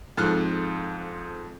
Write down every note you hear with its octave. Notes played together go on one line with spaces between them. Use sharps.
F2 G#2 A4 F6 F#6